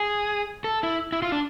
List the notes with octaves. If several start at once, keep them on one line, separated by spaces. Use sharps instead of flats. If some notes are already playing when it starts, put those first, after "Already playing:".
Already playing: G#4
A4
E4
E4
F4
D4